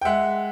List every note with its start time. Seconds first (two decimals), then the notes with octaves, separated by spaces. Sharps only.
0.01 G5
0.05 G#3 E5 F#5